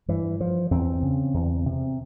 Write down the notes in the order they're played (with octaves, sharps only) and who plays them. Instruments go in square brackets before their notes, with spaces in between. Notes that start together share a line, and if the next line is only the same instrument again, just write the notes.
[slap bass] G2 E3
F3
E2 C4
C#3
E2
C3